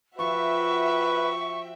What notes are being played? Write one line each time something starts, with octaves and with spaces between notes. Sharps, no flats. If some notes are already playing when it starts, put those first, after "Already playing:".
F3 F#4 B4 E5 G5 C#6